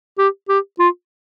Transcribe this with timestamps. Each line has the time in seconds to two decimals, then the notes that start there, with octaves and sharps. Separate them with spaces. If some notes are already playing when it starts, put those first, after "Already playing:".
0.18 G4
0.49 G4
0.79 F4